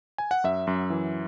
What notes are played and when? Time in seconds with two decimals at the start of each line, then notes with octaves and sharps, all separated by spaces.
0.18 G#5
0.31 F#5
0.44 F#2 E5
0.67 F#2
0.90 E3